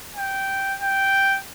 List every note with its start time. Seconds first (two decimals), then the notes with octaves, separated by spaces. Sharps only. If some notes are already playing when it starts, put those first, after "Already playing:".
0.16 G5
0.80 G5